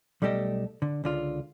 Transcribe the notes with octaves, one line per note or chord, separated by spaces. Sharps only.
B1 G3 A3 G4 A4 D#5
D3
C#2 D3 F4